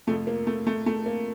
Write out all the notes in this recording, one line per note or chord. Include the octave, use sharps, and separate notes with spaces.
F2 C3 F3 A3
A#3
A3
A3
A3
A#3